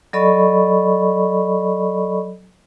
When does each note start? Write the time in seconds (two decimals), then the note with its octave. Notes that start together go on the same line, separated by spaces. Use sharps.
0.13 F#3 A4 D5 D#5 B5 C#6